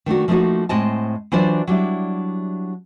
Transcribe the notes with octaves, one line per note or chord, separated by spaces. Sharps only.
D#3 A3 D4 F#4
F3 A3 A#3 D4 D#4 F#4
A2 G#3 C4 C5 D#5 A5
E3 F#3 D4 F4 C5 D5
F#3 G3 D4 E4